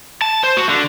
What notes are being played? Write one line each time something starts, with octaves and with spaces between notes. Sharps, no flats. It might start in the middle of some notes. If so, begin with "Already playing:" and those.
A5
C5
F#4
D3